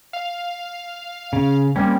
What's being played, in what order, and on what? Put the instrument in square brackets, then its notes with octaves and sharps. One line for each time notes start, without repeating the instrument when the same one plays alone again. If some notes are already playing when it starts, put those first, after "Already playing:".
[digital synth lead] F5
[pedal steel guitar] C#3
[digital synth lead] G3 [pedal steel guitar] A#3 C4 C#4